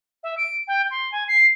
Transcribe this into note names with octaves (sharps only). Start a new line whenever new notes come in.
E5
D7
G5
C6
G#5
C7